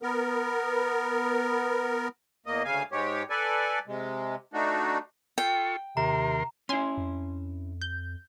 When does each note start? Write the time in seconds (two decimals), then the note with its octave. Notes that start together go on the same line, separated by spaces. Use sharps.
0.02 B3 A#4
2.46 E2 A#3 D#5
2.65 D2 C#3 F5 G#5
2.92 G#2 G#3 G4 C#5
3.30 A4 B4 D5 G#5
3.87 C3 G#3
4.53 A3 D4 D#4 F#4
5.38 F4 A4 G5 C#6
5.97 D#2 C3 A#4 A#5 C6
6.69 C#4 E4 G#5 C6
6.98 F2
7.82 G6